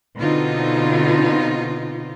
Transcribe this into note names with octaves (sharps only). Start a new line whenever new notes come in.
B2 D3 C4 D#4 F4